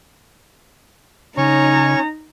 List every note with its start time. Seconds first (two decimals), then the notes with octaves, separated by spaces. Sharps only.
1.37 C#3 C#4 D#4 C#5 A#5 C#6